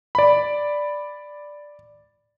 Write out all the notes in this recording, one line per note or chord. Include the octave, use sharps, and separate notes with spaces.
D5 B5